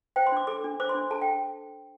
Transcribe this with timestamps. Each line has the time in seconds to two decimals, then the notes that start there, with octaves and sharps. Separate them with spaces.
0.16 C5 G5
0.27 C6
0.32 D4 D6
0.47 A4 D6
0.64 D4
0.80 C5 D6
0.89 C6
0.95 D4
1.11 A4 A5
1.22 G5